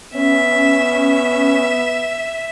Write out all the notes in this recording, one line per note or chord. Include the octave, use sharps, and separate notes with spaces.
B3 C#4 E5